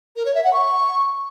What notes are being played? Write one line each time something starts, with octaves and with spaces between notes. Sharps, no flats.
A#4
C#5
E5
F#5
C#6